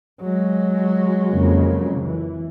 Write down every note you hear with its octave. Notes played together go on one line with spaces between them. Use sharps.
F#3 G#3
F2 C#3 A#3
E3